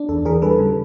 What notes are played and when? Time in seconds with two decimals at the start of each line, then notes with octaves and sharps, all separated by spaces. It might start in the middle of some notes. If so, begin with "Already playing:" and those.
Already playing: D4
0.09 E2 A4
0.25 E3 G#4 A#4
0.42 G3 A4 B4
0.59 C#3